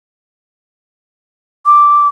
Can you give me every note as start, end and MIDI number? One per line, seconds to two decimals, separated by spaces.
1.66 2.08 86